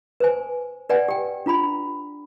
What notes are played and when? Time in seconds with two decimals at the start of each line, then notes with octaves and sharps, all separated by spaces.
0.20 B4 C5 G#5
0.89 B4 D5 F#5 G#5
1.08 G4 G5
1.46 D4 F4 A#5 B5